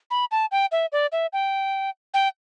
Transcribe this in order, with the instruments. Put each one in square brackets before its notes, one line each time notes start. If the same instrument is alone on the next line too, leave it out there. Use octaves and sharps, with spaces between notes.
[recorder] B5
A5
G5
E5
D5
E5
G5
G5